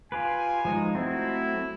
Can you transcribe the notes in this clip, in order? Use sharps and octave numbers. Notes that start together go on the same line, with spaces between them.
F4 G4 B4 G#5
F3 G#3 D#4
F#3 A3 C4 E4